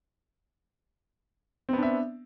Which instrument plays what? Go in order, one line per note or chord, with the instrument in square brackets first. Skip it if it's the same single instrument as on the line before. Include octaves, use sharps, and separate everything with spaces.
[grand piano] C4
B3
D4
E5